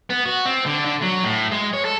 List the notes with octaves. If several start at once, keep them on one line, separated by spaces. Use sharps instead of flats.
B3
F#4
C4
D3
D3
F#3
A2
G#3
C#5
A4